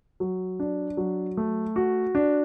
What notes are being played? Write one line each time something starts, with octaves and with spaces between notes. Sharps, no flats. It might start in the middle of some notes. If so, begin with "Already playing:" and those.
F#3
D4
F#3
A3
F#4
D4